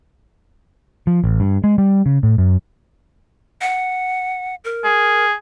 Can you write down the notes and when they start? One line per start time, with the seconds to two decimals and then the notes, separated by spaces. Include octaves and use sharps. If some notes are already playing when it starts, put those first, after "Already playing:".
1.07 F3
1.24 A1
1.40 G2
1.64 G#3
1.78 G3
2.06 C#3
2.23 A2
2.38 F#2
3.61 F#5
4.64 A#4
4.84 G#4